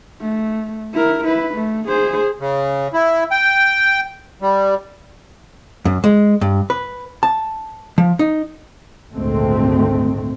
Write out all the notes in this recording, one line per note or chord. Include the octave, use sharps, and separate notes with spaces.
A3
E4 A#4
E4 B4
A3
G#4 C5
C#3
E4
G5
G3
F#2
G#3
G2
B4
A5
F3
D#4
G#1 D2 A#2 G#3 A3 C4